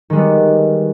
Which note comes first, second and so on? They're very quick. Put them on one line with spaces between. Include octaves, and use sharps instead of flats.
D#3 G#3 G3 B3